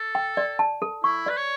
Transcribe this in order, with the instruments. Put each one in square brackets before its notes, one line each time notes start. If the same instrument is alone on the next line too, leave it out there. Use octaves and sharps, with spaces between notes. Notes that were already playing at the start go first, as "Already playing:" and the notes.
Already playing: [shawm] A4
[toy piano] G5
D5
A5
A4
[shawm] E4 [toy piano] C#6
[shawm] B4 [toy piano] D5
[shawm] C#5